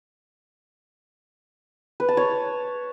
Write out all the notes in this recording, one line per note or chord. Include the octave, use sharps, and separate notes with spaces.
B4
A5
C#5